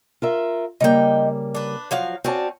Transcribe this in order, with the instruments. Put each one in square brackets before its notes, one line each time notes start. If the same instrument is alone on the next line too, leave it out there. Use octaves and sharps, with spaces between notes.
[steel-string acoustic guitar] F4 A#4 E5
[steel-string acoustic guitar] C#3 G3 A#3 [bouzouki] D#4 G5
[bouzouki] D4 B4
F3 F#3 F5
[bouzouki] C4 C#4 [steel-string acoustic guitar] F#4 D5 A5